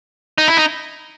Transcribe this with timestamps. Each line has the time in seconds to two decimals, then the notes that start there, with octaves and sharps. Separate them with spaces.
0.38 D#4
0.48 E4
0.57 D#4